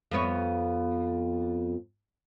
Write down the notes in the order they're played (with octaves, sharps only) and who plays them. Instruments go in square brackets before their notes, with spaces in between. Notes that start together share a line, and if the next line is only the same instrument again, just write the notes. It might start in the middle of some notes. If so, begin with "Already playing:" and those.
[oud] F2 B3 C#5